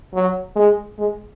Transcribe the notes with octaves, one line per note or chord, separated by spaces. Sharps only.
F#3
G#3
G#3